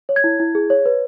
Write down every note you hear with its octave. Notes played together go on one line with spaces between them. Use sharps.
C#5
G#6
E4
E4
G#4
C#5
B4